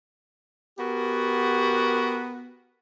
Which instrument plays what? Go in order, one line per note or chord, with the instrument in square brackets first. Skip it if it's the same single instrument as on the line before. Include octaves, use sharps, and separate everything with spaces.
[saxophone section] B3 F#4 G4 A#4